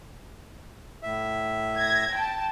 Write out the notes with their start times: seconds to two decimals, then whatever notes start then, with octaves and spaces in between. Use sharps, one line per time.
1.03 A2 E5
1.78 G#6 A#6
2.16 G5 A5